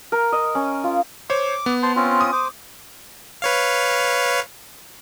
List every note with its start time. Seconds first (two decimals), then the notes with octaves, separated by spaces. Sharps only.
0.12 A#4
0.32 D#5
0.55 C#4
0.84 F4
1.30 C5 C#5 D6
1.66 B3
1.83 C5 A5 C6
1.96 C4 C#4 F4
2.21 D#6
2.33 C5 D6
3.42 B4 C#5 F5